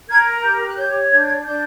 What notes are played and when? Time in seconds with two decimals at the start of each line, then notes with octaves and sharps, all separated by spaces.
0.08 A#4 G#6
0.43 G4 G6
0.66 F#6
0.77 C#5 G6
1.11 D4 G#6
1.19 G6
1.26 G#6
1.45 D4 G6